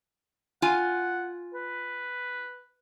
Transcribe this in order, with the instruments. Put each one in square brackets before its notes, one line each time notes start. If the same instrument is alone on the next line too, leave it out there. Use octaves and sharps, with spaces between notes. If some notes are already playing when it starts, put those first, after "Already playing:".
[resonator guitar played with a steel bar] F4 G#5 [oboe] F#5
[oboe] B4